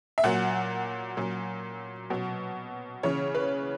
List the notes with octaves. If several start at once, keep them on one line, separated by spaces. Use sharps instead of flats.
E5
A#2 F#3 F#5
A#2 F#3
B2 F#3
C#3 E3 C#5
B4